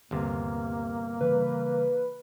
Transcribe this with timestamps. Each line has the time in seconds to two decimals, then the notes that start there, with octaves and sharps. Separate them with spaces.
0.11 G1 D#2 C3 A#3
1.21 C#3 E3 G3 B4